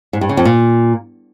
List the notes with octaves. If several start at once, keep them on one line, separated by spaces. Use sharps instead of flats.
G#2
G2
C#3
F2
A#2